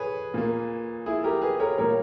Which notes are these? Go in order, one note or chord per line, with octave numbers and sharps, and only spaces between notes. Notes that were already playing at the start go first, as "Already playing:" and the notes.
Already playing: G#4 B4 C#5
A#2 A#3
E4 G#4
G4 A#4
G#4 B4
A#4 C#5
A#2 G3 A#3 A#4 C#5